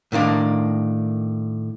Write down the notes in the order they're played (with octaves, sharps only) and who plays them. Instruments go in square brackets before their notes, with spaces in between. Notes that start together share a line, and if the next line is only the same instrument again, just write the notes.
[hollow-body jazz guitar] A2 D#3 A#3 D4